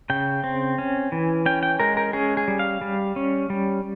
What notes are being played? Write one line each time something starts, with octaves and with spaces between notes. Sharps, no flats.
C#3 G5
C4
C#4
E3
C#4 G5
G5
G#3 A#4
A#4
C#4 G#4
G#4
G3
F5
G3
C#4
G3